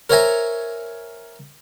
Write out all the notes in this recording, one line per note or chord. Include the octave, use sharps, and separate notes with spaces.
A#4 C5 C#5 E5 G#5 A#5